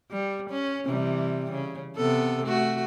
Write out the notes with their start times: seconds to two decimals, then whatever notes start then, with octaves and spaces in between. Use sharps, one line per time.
0.11 G3
0.50 C#4
0.86 C3 E3 G3
1.51 C#3
1.97 C3 B3 A4
2.45 A3 F#4